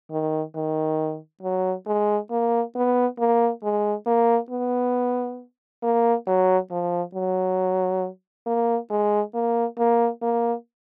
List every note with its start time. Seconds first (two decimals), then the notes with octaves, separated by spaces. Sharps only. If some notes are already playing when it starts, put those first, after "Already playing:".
0.11 D#3
0.56 D#3
1.43 F#3
1.87 G#3
2.31 A#3
2.76 B3
3.19 A#3
3.63 G#3
4.07 A#3
4.51 B3
5.83 A#3
6.27 F#3
6.71 F3
7.15 F#3
8.47 A#3
8.91 G#3
9.35 A#3
9.78 A#3
10.22 A#3